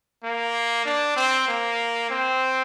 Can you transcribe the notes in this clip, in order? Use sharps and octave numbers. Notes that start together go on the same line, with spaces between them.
A#3
D4
C4
A#3
C4